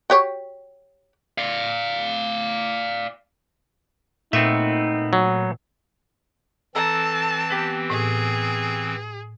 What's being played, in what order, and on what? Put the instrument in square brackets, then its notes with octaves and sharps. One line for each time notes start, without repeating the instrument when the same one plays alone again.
[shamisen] F#4 G4 C#5
[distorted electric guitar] D5 F5
[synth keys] A#2 [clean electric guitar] A3 B3 C4 [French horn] D#4 [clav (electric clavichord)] E5
[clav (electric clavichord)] F#3
[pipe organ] E3 C4 [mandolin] A4 A#5 [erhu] A5
[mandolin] B3 G4
[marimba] A2 [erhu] G#4